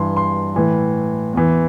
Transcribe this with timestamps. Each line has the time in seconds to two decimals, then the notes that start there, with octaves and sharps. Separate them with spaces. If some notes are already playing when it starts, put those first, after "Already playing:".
Already playing: G2 E3 C6
0.17 C6
0.56 A2 E3
1.33 E2 E3